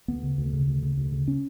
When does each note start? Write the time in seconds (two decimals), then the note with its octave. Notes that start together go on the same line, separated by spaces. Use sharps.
0.08 D2 B3
0.23 C#3
0.38 D2
0.53 C#3
0.68 D2
0.82 C#3
0.97 D2
1.12 C#3
1.28 C#4